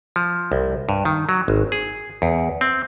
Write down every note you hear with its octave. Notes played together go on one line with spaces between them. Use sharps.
F3
C2
G2
D#3
F#3
G#1
G#4
E2
C4